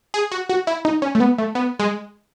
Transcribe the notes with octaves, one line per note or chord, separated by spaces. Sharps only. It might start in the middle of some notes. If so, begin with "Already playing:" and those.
G#4
F#4
F#4
E4
D#4
C#4
A3
B3
A3
B3
G#3